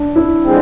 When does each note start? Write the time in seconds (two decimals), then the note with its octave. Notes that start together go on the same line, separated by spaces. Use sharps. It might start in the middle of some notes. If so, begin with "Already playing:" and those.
Already playing: D4
0.16 E4
0.44 D3 F3 G#3 C4